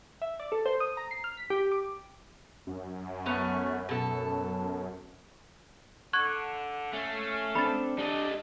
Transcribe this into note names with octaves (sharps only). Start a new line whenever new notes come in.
E5
D5
A4
C5
D#6
A#5
C7
F6
B6
G4
D6
F#2
A3 B3 C#4
B2 A4
D3 C#6 F#6 G#6
A3 C#4 F5
C4 D4 A4 B5 A6
G3 A3 D4 D#5